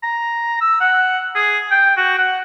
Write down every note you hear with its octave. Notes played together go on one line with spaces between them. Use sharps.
A#5
E6
F#5
G#4
G5
F#4
F#5